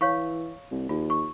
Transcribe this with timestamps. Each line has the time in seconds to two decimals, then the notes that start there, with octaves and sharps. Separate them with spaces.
0.01 E3 C#5 F5 C#6
0.71 C2
0.89 D#2 F4
1.10 C#6